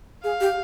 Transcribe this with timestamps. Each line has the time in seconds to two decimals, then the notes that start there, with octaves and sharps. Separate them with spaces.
0.24 G#4 F5
0.40 G4